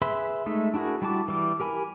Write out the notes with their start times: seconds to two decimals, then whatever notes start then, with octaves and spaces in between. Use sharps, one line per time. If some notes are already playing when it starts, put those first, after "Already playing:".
0.02 G#4 B4 E5 B5 C6
0.46 G#3 A3 D#4 E5
0.74 D4 E4 F#4 G#4 A#4
1.02 G3 E4 F#4 A5 D6
1.28 E3 G3 D6
1.60 G4 A#4 G#5 B5